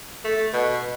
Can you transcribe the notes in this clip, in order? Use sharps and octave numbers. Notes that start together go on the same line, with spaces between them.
A3
B2